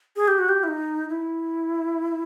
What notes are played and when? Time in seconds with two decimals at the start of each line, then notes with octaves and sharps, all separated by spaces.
0.16 G#4
0.28 G4
0.38 F#4
0.49 G4
0.63 E4
0.68 D#4
1.09 E4